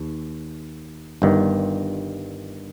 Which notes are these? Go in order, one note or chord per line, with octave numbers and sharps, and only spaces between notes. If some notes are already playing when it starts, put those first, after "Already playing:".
Already playing: D#2
G1 G2 D#3